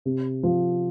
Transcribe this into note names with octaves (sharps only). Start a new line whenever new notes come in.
C3
F3